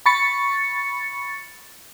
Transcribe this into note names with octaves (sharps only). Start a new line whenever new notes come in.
B5 C#6 A6 C#7